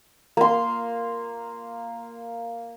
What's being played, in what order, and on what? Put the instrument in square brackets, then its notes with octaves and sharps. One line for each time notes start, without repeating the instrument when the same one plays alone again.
[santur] A#3 C6